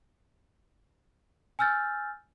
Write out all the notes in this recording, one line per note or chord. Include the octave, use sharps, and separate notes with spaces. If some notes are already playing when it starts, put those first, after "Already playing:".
G#5 E6 F6 G6 A6